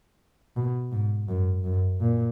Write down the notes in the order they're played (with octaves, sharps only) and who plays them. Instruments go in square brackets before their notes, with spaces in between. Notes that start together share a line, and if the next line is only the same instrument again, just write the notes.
[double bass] B2
G#2
F#2
F#2
A#2